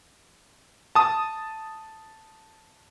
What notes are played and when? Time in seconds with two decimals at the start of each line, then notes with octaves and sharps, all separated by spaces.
0.95 A5 D#6